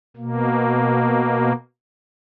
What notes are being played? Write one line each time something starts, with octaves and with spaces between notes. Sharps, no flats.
B2 A#3